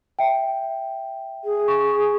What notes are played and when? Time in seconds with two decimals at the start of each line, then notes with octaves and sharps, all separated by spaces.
0.19 E5 G5
1.44 G#4
1.68 C#6